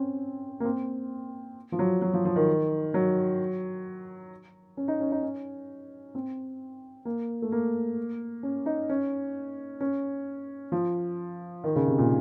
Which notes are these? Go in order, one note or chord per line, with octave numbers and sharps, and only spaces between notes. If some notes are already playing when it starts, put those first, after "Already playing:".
Already playing: C4 C#4
A#3
C4
F3
F#3
F#3
F3
F3
D#3
F#3
C#4
D#4
C#4
D#4
C#4
C4
A#3
A3
A#3
C#4
D#4
C#4
C#4
F3
D#3
C#3
C3
A#2